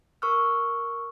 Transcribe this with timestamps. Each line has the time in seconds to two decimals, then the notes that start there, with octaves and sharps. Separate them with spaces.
0.22 A#4 C#6 E6 F6